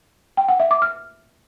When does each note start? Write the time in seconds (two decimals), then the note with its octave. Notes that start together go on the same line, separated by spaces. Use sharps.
0.37 G5
0.49 F#5
0.60 E5
0.71 D6
0.82 F6